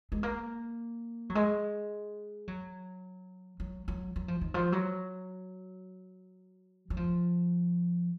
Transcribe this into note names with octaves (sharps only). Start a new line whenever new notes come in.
G#3
A#3
F#3
G#3
F#3
F#3
F#3
F#3
F3
D#3
F3
F#3
F#3
F3